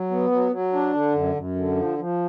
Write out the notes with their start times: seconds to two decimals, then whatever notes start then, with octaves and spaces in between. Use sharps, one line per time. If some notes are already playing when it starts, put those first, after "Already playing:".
Already playing: F#3
0.11 B3
0.31 F#3
0.51 F#3
0.73 D4
0.93 D3
1.14 F#2
1.35 F#2
1.56 D3
1.76 F3
1.98 F3